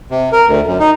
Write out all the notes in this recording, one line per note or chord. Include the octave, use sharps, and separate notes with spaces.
C3
A#4
D2
F#2
D#4